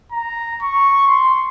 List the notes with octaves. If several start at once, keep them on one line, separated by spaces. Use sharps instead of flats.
A#5
C#6
C6